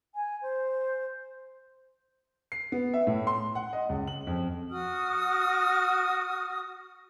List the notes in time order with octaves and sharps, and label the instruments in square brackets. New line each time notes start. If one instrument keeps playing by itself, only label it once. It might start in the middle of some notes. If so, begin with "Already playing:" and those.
[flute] G#5
C5
[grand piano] C7
B3
E5
A2
C6
F#5
D#5
C#2
F#7
F2
[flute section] F#4 D#6 F6